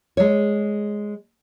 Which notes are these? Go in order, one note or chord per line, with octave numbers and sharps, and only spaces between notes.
G#3 C#5